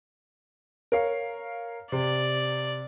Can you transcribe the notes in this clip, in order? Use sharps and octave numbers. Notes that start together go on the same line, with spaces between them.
A#4 C#5 F5
C3 D5